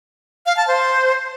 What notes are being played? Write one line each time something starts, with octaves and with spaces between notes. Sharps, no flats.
F5
A5
C5